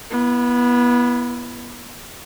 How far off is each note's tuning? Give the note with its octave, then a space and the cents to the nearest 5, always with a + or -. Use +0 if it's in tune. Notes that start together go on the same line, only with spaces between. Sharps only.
B3 -25 E4 +20